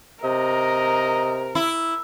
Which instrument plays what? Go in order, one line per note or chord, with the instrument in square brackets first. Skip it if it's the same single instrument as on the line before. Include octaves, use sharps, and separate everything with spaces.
[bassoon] C3 [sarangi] A#4 [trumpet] D#5
[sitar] E4